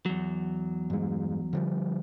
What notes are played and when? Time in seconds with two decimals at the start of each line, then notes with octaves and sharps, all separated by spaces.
0.06 E2 F#3
0.90 G2 G#3
1.53 D3 F3 G3